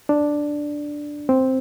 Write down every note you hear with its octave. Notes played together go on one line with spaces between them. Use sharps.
D4
C4